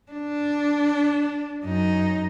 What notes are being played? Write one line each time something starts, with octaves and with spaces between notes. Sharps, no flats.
D4
F#2 D#4